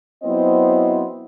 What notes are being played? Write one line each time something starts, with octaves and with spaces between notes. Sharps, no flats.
F#3 B3 C4 E4 C5 D#5